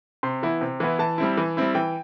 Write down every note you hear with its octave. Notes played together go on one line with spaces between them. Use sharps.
C3 C6
E3 B3 E4
C3
E3 B3 E4
E3 A5
G3 C4 E4
E3
G3 C4 E4
E3 G5